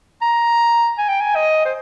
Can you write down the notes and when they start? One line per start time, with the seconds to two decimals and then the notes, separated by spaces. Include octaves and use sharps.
0.22 A#5
0.98 G#5
1.09 G5
1.21 G#5
1.36 D#5
1.65 C5